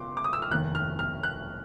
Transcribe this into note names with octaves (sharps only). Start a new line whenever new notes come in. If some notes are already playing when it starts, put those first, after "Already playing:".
Already playing: C#2 C6 D6
D6
D#6
E6
F6
F1 D#2 D#3 F#6
F6
F6
F#6